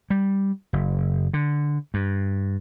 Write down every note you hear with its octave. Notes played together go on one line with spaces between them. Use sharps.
G3
F#1
D3
G2